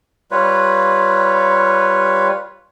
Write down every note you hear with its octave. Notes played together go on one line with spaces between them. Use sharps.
G3 F4 B4 C#5